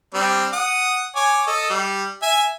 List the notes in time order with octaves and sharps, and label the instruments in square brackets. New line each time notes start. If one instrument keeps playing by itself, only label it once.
[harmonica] G3 C4 D4
F#5 D#6
C#5 G#5 D6
A4 D#5
G3
E5 G#5